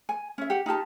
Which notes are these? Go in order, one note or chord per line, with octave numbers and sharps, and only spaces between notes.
G#5
C#4 E5
G4 F#5
D#4 F4 G4 A5